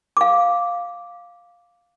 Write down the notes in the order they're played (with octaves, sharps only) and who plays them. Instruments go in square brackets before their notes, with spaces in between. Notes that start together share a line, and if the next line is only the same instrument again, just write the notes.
[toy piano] F5 D6